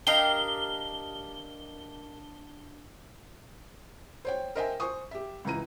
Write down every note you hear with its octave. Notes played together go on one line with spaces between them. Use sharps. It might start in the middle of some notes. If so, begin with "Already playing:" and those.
D4 G4 A#4 D#5 F5 G7
C5 C#5 G5
A#4 C5 D#5 E5 G5 G#5
C5 G#5 C#6 D#6
G4 E5
C#2 E3 A#5 D#7